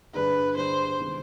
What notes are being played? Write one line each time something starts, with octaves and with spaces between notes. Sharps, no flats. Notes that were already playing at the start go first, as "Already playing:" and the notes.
G2 D3 G3 D4 G#4 B4
G2 D3 G3 D4 G#4 C5
C3 D#3 G#3 B3